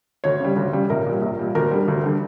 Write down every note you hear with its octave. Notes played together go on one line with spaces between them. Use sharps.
D2 C#5
C#3 G3
D2
C#3 G3
A#1 A#4
A#2 G3
A#1
A#2 G3
D2 A#4
D3 G3
D2
D3 G3